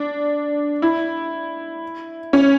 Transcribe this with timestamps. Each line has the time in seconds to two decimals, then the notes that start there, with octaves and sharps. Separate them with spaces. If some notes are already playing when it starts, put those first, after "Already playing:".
Already playing: D4
0.82 E4
2.33 C#4